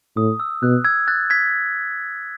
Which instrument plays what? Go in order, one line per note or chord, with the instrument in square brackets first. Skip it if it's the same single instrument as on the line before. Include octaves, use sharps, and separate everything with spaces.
[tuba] A2 [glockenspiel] D#6
[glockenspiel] E6
[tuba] B2 [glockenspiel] F#6
[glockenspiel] E6 G#6
F#6 A6
G#6 B6